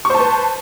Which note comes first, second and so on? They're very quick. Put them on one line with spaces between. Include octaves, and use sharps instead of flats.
C#6 C5 A5 B4